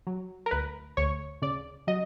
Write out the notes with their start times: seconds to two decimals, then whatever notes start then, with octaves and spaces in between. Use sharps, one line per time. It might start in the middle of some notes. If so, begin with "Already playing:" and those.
0.07 F#3
0.46 A#4
0.51 D2 B4
0.97 D2 C#5
1.42 C#3 D5
1.87 F#3 D#5